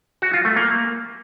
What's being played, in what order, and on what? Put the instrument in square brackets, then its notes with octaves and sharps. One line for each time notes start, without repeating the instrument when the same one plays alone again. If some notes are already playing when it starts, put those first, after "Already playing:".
[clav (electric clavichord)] F#4
F4
A3
A#3